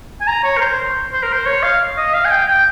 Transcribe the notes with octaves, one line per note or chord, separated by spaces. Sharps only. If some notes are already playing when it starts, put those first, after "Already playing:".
G#5
A#5
C#5
A#4
C5
C5
A#4
C5
C#5
F5
D#5
F5
G#5
G5
G5